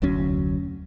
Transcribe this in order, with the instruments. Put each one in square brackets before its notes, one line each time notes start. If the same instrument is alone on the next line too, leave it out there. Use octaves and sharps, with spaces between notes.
[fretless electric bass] F1 D2 F#3 C#4